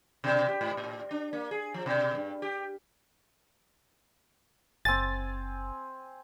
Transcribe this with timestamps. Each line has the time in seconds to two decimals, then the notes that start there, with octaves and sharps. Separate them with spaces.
0.24 B2
0.48 G4
0.61 G#2
0.77 A2
1.11 D4
1.33 A#3
1.51 G#4
1.74 F3
1.86 B2
2.15 G2
2.42 G4
4.85 F#1 C4 G#5 A6